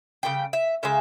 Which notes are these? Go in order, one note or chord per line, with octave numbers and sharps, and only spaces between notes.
C#3 G3 G5
E5
C#3 G#3 E5